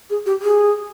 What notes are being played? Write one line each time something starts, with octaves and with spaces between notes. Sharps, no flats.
G#4
G4
G#4